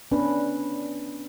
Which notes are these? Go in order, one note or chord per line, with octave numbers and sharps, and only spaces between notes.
B3 C#4 D4 B4